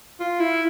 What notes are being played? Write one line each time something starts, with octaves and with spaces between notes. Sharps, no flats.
F4
E4